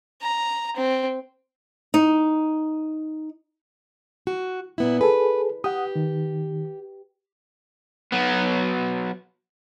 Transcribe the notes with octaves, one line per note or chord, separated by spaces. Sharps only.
A#5
C4
D#4
F#4
A#2 B3 E4
G#4 A4 B4
G4 F#5 D#6
D#3
F#3 B3